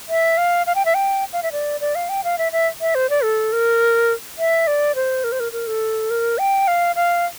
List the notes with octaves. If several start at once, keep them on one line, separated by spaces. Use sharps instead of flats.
E5
F5
F5
G5
E5
G5
F5
E5
D5
D5
F5
G5
F5
E5
E5
E5
C5
D5
A4
A#4
E5
D5
C5
A#4
C5
A#4
A#4
A4
A#4
G5
F5
F5